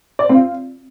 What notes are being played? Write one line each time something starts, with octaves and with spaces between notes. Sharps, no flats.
D5
C5
C4
F4